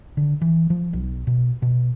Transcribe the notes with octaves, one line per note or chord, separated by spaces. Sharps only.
D3
E3
F3
B1
B2
B2